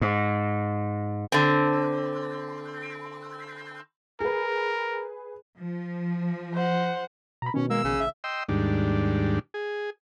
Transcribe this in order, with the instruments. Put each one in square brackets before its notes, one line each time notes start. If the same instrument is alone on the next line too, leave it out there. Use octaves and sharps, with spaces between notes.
[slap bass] G#2
[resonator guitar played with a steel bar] D3 C4
[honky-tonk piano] G#4 B4 [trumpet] A#4
[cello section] F3
[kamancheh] C5 F#5
[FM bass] B2 [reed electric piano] A#5 B5
[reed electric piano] B2 D#3 [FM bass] C#4
[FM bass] G#3 [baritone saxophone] A#3 [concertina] E6
[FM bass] A#1 [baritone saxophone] C#3
[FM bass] A1 [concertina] E5
[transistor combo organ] D#5 G5 C6 E6
D#2 G#2 G3 D4
G#4